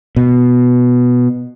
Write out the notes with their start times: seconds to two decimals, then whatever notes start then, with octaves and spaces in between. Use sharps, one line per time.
0.16 B2